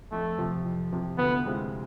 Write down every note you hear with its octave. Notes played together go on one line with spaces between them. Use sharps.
F2 A3
C3 F3
F2
C3 F3
D2 B3
C3 G#3 C4 F4